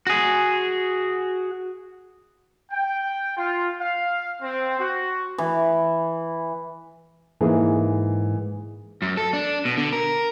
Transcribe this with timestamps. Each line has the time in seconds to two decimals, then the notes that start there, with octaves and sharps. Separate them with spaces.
0.07 F#4 G#4
2.71 G5
3.37 F4
3.80 F5
4.41 C4
4.79 F#4
5.38 E3
7.41 G#2 E3 A#3 G#4
9.02 F#2
9.17 A4
9.33 D4
9.65 B2
9.77 D3
9.93 A#4